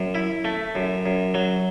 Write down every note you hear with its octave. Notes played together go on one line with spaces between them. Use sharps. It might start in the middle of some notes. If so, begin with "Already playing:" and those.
Already playing: F#2
E4
A3
F#2
F#2
F#3